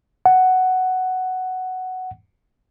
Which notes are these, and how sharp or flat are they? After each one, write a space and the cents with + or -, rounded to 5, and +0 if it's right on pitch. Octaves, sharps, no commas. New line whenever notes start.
F#5 +5